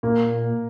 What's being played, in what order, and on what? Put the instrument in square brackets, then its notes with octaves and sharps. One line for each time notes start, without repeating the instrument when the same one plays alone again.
[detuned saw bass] A#2 [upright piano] A#3